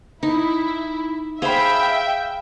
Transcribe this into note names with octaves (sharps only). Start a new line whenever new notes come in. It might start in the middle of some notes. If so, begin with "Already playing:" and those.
D#4 E4
G#4 C5 E5 F5 G5 B5